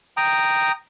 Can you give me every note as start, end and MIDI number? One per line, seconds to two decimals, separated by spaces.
0.17 0.72 79
0.17 0.72 82
0.17 0.72 87